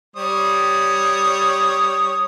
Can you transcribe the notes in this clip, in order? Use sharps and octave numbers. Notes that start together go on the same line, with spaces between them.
G3 C#5 D#6